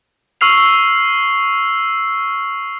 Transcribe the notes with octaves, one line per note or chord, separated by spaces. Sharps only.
C#6 E6 F6 C7 F7